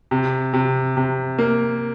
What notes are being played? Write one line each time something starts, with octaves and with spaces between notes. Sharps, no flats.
C3
C3
C3
A#3